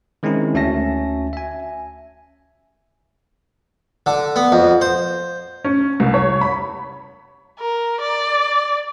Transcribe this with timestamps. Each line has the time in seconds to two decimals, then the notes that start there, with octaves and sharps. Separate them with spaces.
0.23 D#3 G#3 C4 C#4 D#4 E4
0.54 D2 C#4 F#4 E5 A5 A#6
1.33 E5 G#5
4.06 D3
4.36 B3
4.52 F2
4.81 C5
5.64 C#4
6.00 C2
6.14 C#5
6.41 B5
7.59 A#4
8.01 D5